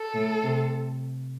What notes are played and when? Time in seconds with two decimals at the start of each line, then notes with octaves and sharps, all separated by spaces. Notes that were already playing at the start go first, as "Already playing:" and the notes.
Already playing: A4
0.14 A2
0.43 C3